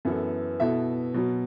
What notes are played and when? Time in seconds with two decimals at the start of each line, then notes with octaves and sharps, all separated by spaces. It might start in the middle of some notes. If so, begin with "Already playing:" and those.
0.05 F#2 E3 B3 E4 A4
0.60 B2 B3 E4 A4 E5
1.14 B2 F#3 B3